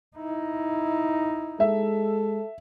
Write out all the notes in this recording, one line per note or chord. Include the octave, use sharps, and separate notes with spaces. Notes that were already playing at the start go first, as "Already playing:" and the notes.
D#4 E4
G#3 A4 E5